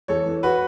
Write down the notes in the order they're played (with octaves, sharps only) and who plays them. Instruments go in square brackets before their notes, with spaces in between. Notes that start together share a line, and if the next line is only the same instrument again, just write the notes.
[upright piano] E2 A4 C#5
E3
F#4 B4